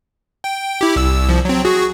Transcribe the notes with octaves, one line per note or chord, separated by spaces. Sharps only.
G5
E4 G4
C2 E6
C2 F3
F#3 C4
F#4 G#4